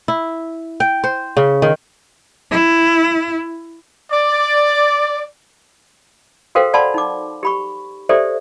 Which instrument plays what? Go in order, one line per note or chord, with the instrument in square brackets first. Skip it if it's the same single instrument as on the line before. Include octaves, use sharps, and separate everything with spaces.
[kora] E4
G5
C5
C#3
D#3
[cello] E4
[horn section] D5
[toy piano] F#4 A4 A#4 C5 F5 G5
D5 F#5 A5 B5 C6
D#4 D6
G4 B5 C#6
G4 A4 C5 D5 E5